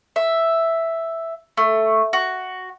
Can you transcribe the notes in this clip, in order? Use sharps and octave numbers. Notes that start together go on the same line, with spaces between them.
E5
A3
F#4